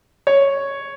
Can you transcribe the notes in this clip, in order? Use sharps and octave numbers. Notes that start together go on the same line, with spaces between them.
C#5